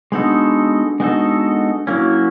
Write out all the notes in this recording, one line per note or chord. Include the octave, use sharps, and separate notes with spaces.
G#3 B3 D4 D#4 F#4 A4
G#3 B3 D#4 F#4 A4
F#3 A#3 C#4 E4